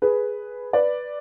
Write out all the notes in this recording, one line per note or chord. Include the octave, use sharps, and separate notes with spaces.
G#4 B4
B4 D5